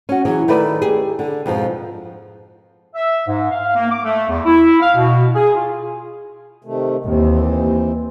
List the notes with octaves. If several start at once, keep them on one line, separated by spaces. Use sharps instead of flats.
C#4 F#4
E3 F#3 C#4 G#4
D#3 A3 E4 B4 D5
G4 G#4
D3
F2 G#2 B2 F3
E5
G#2
F5
A#3
D6
A3
E2
E4
F5
B2
G#4
F4
C3 D#3 A3
D#2 E3 C4